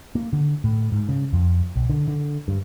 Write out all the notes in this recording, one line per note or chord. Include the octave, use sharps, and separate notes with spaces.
A#3
D3
A2
G#2
C#3
F2
B1
D3
D3
G2